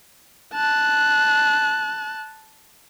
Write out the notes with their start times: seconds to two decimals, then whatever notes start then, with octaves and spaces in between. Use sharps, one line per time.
0.54 A5 F#6